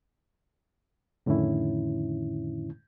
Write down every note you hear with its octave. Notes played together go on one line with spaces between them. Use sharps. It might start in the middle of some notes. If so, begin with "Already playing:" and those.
F2 A2 D3 D#3 C#4 E4